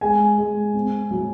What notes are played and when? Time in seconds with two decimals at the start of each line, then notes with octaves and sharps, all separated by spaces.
0.01 G#3 G#5
0.38 G#3
0.74 C4
1.11 F#3